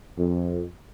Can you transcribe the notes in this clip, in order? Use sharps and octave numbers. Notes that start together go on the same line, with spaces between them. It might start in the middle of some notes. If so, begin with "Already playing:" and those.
F2